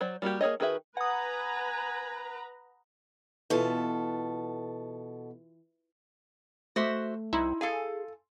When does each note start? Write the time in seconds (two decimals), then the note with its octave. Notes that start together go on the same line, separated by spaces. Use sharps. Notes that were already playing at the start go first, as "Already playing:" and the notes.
0.01 F#3 C5 D5
0.22 G3 A#3 F#4 G4
0.41 A#3 G#4 C#5 D#5
0.60 D#3 F#4 G#4 B4 E5
0.97 B4 F#5 G#5 A#5 D#6
3.50 B2 E3 F4 A4
6.76 A3 F#4 C5 E5
7.33 C2 D#4 E4 C6
7.61 G#4 A4 F5 G#5